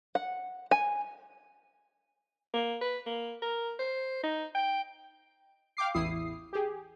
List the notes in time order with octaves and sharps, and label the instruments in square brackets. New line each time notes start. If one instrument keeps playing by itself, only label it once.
[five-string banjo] F#5
G#5
[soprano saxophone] A#3
B4
A#3
A#4
C5
D#4
G5
[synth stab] F5 G5 D6 C7
A1 E2 E4 D#6 C7
G4 G#4